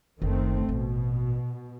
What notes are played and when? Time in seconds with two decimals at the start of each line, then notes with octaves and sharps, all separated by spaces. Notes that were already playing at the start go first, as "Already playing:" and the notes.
0.22 F#1 D#3 A3 C4
0.69 A1 B2